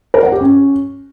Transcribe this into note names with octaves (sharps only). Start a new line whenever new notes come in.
A#4
F#5
G4
C#4